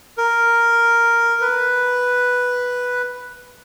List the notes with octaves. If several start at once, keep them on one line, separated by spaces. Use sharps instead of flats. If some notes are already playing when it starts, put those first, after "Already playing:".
A#4
B4